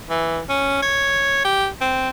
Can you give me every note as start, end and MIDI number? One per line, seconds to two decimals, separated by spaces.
0.10 0.40 52
0.49 0.79 61
0.82 1.42 73
1.45 1.67 67
1.81 2.09 60